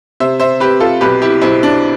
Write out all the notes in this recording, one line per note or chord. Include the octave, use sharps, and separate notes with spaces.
C3 C5 E5
C5 E5
C3 G4 B4
F4 A4
B1 G4 B4
E4 G4
B1 C4 E4
D4